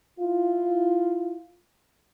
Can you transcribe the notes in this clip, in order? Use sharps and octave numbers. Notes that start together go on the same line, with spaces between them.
E4 F4